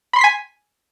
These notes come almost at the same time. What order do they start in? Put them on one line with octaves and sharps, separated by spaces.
B5 C6 C7 B6 G#5